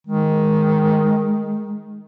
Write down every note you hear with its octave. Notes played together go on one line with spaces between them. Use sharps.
D#3 G#3